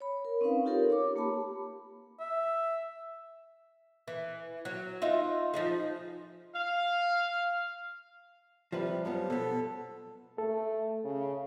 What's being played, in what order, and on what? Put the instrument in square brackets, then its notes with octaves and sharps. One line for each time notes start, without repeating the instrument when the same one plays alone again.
[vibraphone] C#5 B5
A#4
C4 C#4 D#4 B4 F5
D#4 F4 G4 A4 A#4 C#5
C#5 D6
A#3 G4 A5 B5
[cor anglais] E5
[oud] E3
F#3
D#4 F4 E5
F3 D#4 G#4
[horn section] F5
[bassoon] C3 [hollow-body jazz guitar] F3 G3 B4
[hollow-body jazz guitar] F#2 G3 B3 [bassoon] F3
[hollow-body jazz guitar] B2 B3 [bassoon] A4
[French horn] A3 [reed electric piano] A4
[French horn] C#3